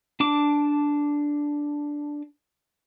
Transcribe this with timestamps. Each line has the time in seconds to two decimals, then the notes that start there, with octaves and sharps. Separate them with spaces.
0.20 D4 A5 D6